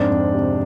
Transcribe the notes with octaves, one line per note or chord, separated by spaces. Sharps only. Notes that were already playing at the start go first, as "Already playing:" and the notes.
Already playing: F2 G#2 D4
F2
C3